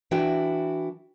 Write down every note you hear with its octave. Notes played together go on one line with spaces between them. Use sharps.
E3 D4 E4 F#4 G5